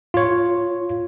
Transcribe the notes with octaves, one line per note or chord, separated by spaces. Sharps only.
F4 C#5